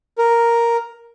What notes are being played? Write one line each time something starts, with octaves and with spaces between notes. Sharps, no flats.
A#4